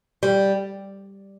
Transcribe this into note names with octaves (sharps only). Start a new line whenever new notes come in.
G3